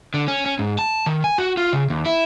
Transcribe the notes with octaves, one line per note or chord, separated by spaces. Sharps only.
D3
C#4
C#4
G#2
A5
D#3
G#5
F#4
F4
C#3
D#2
E4